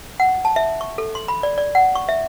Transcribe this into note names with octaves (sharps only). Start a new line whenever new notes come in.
F#5
A5
E5
C#6
A4
C6
B5
D5
D5
F#5
C#6
E5